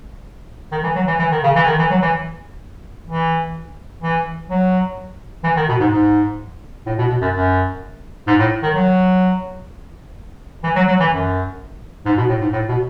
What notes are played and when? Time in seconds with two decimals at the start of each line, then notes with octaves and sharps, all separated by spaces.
0.72 D#3
0.84 E3
0.96 F#3
1.07 E3
1.19 E3
1.31 D#3
1.44 C#3
1.56 E3
1.66 D#3
1.79 E3
1.91 F#3
2.02 E3
3.09 E3
4.02 E3
4.50 F#3
5.44 E3
5.57 D#3
5.69 B2
5.80 G#2
5.91 G#2
6.86 A2
6.98 B2
7.09 B2
7.21 F#2
7.34 F#2
8.27 G#2
8.39 A2
8.63 D#3
8.74 F#3
10.64 E3
10.76 F#3
10.88 F#3
11.00 E3
11.12 F#2
12.06 G#2
12.18 B2
12.29 A2
12.41 G#2
12.53 A2
12.69 B2